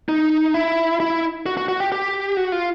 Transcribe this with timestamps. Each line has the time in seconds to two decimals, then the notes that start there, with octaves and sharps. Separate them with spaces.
0.09 D#4
0.54 E4
1.00 E4
1.46 F#4
1.57 F#4
1.68 F#4
1.80 G4
1.92 G4
2.37 F#4
2.52 F4